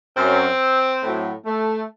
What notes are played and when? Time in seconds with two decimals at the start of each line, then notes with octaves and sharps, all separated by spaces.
0.17 F#2 F#3 C4
1.02 A2 F#3
1.46 A3